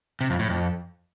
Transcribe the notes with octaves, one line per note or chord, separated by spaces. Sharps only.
C3
F2
A2
F2